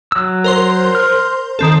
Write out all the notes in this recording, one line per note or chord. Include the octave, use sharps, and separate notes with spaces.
F#3 E6
A#4 C5 C6
F6
D#3 C4 A4